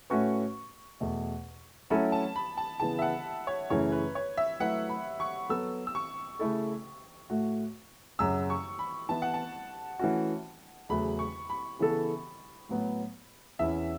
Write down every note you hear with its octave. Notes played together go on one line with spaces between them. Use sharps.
A2 A3 C#4 F#4 B4 C#6
E2 B2 A3
F#3 A3 C#4 E4 A4 B5
A5
B5
A5
C#3 E3 B3 A5
E5
F#5
C#5
F#2 C#3 E3 A3 C#4 C#5
B4
C#5
E5
F#3 A3 E4 B4 F#5
B5
C#6
F#3 B3 A4 E6
E6
C#6
C#3 A3 E4 A4
A2 A3 F#4
F#2 C#3 F#3 E6
C#6
B5
E3 B3 E4 A5
F#5
A5
E3 A3 C#4 F#4
E2 C#3 F#3 A3 F#4 B5
C#6
B5
C#3 E3 B3 A4
A2 F#3 B3
E2 E3 C#4 E4 E5